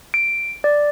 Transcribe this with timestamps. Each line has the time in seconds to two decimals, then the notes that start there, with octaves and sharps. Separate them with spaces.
0.14 D7
0.64 D5